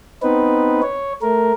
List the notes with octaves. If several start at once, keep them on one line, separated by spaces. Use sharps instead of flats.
B3 C4 D#4 B4
C#5
A3 A#4